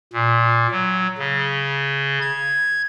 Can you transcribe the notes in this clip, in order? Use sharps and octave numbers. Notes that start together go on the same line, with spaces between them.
A#2
F#3
C#3
G#6